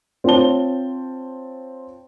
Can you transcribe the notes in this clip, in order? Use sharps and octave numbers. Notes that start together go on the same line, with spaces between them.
C4 F4 C5 C#5 A5 G7